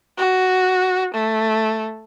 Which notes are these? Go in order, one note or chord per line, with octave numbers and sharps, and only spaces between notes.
F#4
A3